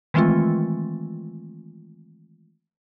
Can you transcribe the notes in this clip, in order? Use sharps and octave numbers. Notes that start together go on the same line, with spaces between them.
D#3 E3 G#3 A3 C4 F4